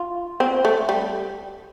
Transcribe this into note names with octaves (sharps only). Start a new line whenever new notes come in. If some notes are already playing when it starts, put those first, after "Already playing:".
Already playing: F4
C4
A3
G3